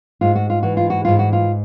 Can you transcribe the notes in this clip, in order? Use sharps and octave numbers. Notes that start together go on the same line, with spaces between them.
G#2 F4
F#4
F4
E3 F#4
F4
F#4
G#2 F4
F#4
F4